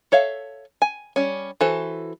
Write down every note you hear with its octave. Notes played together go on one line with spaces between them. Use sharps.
A4 C#5 E5 F5
G#5
G3 C#4
E3 F#4 A4 C5